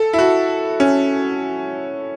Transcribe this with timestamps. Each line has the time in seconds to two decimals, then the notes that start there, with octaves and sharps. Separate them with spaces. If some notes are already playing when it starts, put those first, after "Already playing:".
Already playing: A4
0.13 E4
0.19 F#4
0.80 C#4